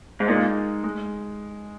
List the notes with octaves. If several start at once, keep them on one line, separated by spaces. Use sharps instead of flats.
G#2
A#2 G#3 D#4 A#4
G#3